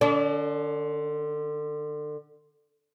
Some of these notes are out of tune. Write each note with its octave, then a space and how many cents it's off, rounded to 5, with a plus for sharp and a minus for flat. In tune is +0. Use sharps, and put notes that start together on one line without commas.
D3 +30 D4 -40